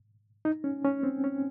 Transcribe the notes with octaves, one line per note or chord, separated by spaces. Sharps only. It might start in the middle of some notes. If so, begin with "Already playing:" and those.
D#4
C#4
C#4
C4
C#4